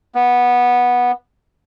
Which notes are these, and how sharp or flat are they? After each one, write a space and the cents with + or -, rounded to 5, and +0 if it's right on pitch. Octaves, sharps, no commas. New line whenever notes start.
B3 -10